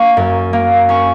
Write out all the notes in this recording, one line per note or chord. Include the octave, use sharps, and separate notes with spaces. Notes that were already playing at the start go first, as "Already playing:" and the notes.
Already playing: A#3 C#6
F#2
A#3
C#4 C#6